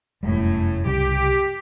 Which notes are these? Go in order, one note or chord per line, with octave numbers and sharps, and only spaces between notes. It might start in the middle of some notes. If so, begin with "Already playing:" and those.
F1 F#2 A2 G3
C2 C#3 G3 G4